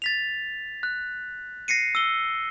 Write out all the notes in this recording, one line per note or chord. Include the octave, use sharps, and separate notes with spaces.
A6 B6 F7
F#6
A#6 C7 C#7 D#7
E6 G7